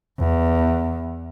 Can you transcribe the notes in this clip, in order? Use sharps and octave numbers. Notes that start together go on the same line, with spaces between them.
E2